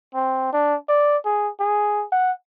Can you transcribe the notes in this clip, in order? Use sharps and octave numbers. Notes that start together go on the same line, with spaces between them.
C4
D4
D5
G#4
G#4
F#5